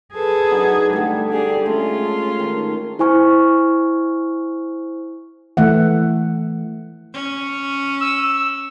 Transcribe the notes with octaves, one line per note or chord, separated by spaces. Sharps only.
G#4 A4 B4
F#3 D4 D#4
D3 G3 A3
D4 G4 G#4
G#3 A3 C#4 F4
D#3
E4 C5 G#5 C#6 F6
E3 A3 E5 F#5
C#4
E6